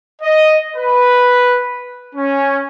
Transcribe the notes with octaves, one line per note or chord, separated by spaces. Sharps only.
D#5
B4
C#4